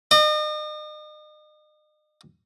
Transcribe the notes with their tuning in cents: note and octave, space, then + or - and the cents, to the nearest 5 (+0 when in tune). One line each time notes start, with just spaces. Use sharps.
D#5 -40